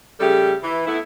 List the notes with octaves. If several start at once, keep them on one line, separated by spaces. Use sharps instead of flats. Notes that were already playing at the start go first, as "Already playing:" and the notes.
C#3 G3 A3 G4 A4
E3
A3 B3 E4